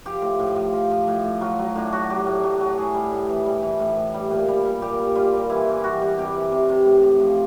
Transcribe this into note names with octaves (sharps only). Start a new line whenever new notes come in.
F3 G4
A2
A2
F3
F3
F3
A2
A2
F#3 F4
F#3
A2 D4
F#3 F#4
F#3 G4
A2
F#3
F#3
A2 G#4
G3
A2
E3
G3
E3
A2
A2
G3
A#2
G3
G3
A#2 G4
G3
G3 F4
A#2
E3 E4
E3
G3 F#4 G4
G3
C3 G4
E3
C3
C3
A2
A2
F3